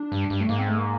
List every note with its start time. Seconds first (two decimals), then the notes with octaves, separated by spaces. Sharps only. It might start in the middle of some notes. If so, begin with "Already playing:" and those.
Already playing: D4
0.12 G2
0.30 G2
0.40 A3
0.49 G#2 A#3
0.59 C4
0.68 A3
0.77 A#3